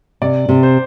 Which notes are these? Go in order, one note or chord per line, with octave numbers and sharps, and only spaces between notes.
C3 D5
C3
C5